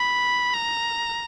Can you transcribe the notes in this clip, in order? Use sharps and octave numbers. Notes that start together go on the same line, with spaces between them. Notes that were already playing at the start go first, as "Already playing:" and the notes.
Already playing: B5
A#5